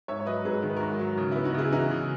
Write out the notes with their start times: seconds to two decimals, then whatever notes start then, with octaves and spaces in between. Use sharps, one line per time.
0.08 G#2 C#5 E5
0.20 C#5
0.26 F#3 B4 D#5
0.45 G#2 G#4 B4
0.62 D#3 A#4
0.70 B4
0.77 G#2 F#4 A#4
0.99 F#3
1.18 C#3
1.32 B3 E4
1.44 D#4 F#4
1.54 C#3 E4 G#4
1.72 E3 D#4 F#4
1.91 C#3